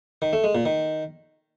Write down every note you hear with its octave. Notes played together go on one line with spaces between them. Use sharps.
D#3
A3
G#3
A#2
D#3